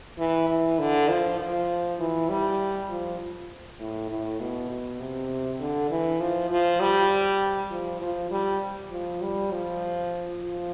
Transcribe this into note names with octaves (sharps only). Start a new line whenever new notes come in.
E3
E3
D3
F3
F3
E3
G3
F3
A2
A2
B2
B2
C3
D3
E3
F3
F3
G3
F3
F3
G3
F3
G3
F3
F3